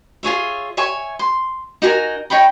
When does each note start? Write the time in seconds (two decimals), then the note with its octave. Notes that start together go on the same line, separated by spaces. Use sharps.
0.23 F4 G#4 C#5 E5
0.77 C#5 E5 G#5 C#6
1.19 C6
1.82 D#4 F#4 A#4 G#5
2.30 D#4 C#5 G5 B5